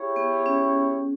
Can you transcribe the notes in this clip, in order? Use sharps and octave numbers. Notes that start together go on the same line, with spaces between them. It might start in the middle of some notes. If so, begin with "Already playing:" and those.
Already playing: E4 G4 G#4 C#5
B3
C#4